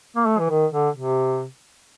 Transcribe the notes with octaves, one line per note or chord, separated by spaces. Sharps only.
A#3
A3
E3
D#3
D3
C3